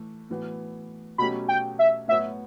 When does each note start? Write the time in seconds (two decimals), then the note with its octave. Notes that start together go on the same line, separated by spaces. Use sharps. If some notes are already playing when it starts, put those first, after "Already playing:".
Already playing: A2 E3 A3
0.30 A2 E3 B3 F#4
1.18 B2 F#3 A3 C#4 G4 B5
1.48 G5
1.79 E5
2.08 A2 F#3 B3 F#4 C#5 E5